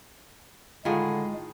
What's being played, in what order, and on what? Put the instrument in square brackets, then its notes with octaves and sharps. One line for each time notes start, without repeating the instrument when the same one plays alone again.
[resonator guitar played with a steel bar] A2 D#3 G#4 [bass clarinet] D3 [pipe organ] G#3 [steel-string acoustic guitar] F4